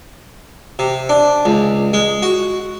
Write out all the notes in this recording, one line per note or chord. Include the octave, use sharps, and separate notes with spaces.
C3
D4
C#2
G#3
F#4